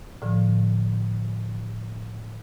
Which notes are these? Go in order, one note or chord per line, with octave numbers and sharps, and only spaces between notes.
A2 D3 F3